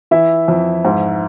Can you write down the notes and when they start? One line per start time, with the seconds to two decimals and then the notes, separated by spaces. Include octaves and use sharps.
0.11 E3 E4 E5
0.48 F2
0.85 G#2